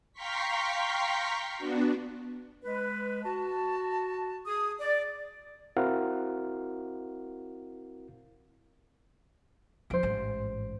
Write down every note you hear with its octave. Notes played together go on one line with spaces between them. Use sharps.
F5 G5 A#5 C6 C#6 B6
B3 D4 F#4
G#3 B4
F#4 A5
G#4 D#6
D5
C4 E4 F#4 A#4 F5 F#5
E2 F3 C5 D7
A1 G#2